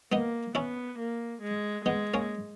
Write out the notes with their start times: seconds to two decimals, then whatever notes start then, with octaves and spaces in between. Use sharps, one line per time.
0.12 A#3 B3 D#4
0.55 B3 C#4 E4
0.99 A#3
1.42 G#3
1.85 G#3 B3 D#4
2.14 A#3 C#4